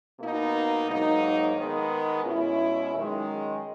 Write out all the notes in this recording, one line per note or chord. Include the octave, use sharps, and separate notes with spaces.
B2 A#3 D#4
G#2 F#3 A#3 D#4
D#3 G#3 B3
B2 G#3 C#4 E4
F#2 D#3 G#3 D#4